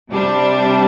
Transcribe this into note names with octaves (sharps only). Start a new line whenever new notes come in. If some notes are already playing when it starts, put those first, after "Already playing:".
C3 G3 D4